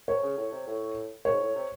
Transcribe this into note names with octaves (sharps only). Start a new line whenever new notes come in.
C3 C#5
C#3
A2
C3
A2
G#2 C#5
A2
C3